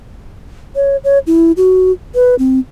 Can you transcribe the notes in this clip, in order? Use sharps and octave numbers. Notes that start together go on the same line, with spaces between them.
C#5
C#5
E4
F#4
B4
C4